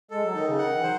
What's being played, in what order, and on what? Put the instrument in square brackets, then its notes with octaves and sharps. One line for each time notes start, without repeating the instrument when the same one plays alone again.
[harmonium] G#3 [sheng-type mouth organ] A4
[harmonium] F#3
[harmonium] D#3 [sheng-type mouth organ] D#4
[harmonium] C#3
[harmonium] D#3 [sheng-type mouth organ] F#5
[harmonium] E3
[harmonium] F#3 [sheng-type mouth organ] C5